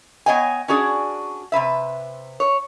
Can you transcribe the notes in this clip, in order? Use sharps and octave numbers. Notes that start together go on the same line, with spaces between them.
B3 C#5 D#5 G5 G#5
C#4 D4 F#4 G#4 D5
C3 D#3 B4 E5
C#5